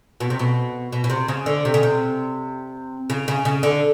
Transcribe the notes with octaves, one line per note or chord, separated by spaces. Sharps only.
B2
C3
B2
B2
B2
C3
C#3
D3
C3
C#3
C3
C#3
C#3
C#3
D3